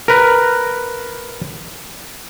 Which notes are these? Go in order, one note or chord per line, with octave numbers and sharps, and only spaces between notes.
A#4 B4